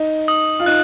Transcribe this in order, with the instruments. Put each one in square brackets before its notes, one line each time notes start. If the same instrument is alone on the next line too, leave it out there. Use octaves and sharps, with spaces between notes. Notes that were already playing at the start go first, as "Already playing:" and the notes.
Already playing: [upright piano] D#4
[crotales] D#6
[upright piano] F4
[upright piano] D#4 [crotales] F#6